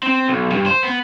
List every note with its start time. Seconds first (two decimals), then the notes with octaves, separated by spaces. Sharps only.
0.03 C4
0.28 B1
0.52 G2
0.66 C5
0.83 B3